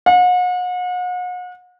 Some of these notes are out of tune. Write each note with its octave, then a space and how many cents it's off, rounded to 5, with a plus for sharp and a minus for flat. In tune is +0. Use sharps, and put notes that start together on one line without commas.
F#5 -40